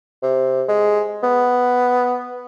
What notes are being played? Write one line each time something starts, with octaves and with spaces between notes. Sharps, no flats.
C3
G#3
B3